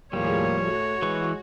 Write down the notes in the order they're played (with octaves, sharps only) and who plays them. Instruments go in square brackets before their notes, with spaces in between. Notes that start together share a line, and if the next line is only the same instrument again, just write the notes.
[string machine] D#2 A2 G#4 [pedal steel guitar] F3 G3 [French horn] A#3 [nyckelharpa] C#5
[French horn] A3 [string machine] F#4
[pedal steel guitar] E3 B4 C#6 [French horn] G#3